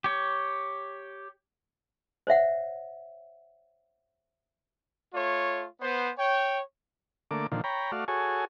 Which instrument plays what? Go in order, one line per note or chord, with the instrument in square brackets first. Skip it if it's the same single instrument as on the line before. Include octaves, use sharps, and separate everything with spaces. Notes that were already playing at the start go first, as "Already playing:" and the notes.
[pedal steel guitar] G4 C#5
[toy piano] C5 C#5 E5 F#5
[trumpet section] A3 F4 C#5
B3 C5
C#5 G5
[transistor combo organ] D3 A3 A#3 D6
A#2 D3 D#3 F3
C#5 G5 A#5 B5
A3 F#4 D5 F5
F#4 G#4 A4 C#5 G#5